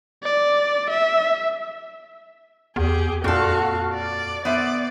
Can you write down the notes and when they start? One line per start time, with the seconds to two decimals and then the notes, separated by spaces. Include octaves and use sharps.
0.23 D5
0.90 E5
2.76 E2 G4 G#4
3.24 F2 A#2 F#4 A4 F5
3.94 D5
4.45 B3 C5 D5 E5